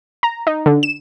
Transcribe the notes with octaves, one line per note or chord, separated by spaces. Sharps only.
A#5
D#4
D3
E7